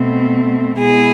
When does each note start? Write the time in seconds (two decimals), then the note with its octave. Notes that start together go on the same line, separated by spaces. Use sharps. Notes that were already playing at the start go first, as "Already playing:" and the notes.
Already playing: B2 A3 C4
0.79 B2 G#3 B3 E4 G#4